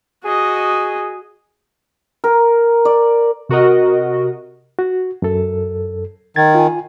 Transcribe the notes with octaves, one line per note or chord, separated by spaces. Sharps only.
F#4 G#4 D#5
A#4
D5
C3 F#4 A#4 D#5
F#4
F#2 A4
D#3 G#6 A6
F4 G#5